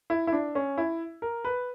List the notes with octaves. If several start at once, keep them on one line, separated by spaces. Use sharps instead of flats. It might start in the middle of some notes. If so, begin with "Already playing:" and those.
E4
E4
D4
C#4
E4
A#4
B4